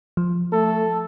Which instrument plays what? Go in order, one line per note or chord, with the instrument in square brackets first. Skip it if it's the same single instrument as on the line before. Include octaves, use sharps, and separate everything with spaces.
[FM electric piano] F3
[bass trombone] A3 [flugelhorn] A4